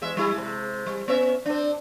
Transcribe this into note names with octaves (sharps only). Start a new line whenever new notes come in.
E2 G#3 E5
G3 E4 G#4
C3 G#3
G3
B3 C#4 E5
C4 D4